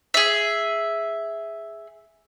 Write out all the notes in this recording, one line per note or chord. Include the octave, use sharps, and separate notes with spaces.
G#4 E5